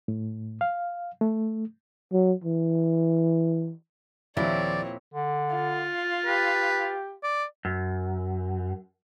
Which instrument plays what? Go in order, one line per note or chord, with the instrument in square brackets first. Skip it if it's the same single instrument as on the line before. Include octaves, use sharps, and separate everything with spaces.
[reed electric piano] A2
F5
A3
[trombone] F#3
E3
[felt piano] D#2 F3 [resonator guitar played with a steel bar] A#2 E4 [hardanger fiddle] C4 C#5 [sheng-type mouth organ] D5
[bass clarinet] D3
[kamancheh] F4
[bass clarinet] G4 [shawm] B4
[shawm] D5
[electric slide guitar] F#2